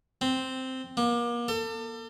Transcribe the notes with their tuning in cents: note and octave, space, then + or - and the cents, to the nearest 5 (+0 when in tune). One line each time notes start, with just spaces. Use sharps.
C4 -5
A#3 +35
A4 +35